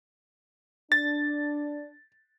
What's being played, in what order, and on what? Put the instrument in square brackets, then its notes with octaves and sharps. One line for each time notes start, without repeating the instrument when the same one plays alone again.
[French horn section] D4 [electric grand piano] A6